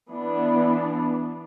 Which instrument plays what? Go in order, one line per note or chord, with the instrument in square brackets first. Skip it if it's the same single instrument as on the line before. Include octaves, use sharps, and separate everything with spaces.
[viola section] E3 B3 D4